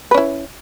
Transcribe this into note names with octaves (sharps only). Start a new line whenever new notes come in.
C#4 E4 B4